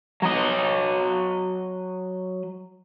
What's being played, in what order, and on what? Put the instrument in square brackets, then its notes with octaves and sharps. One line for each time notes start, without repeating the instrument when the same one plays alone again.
[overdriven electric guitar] F#3 D#5